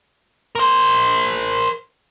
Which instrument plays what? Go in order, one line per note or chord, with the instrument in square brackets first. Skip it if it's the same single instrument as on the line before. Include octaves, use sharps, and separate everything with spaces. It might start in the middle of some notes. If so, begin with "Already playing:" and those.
[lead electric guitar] A#4 C5